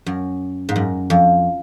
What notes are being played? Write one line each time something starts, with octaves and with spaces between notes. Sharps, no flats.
F#2
G#2
F#2
F2